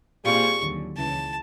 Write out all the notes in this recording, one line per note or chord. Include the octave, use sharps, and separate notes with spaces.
A#2 G3 C4 F4 G#4 C#6
D#2 D3 F#3
C#2 C#3 E3 A5